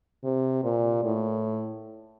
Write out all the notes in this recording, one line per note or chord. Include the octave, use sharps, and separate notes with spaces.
C3
A#2
A2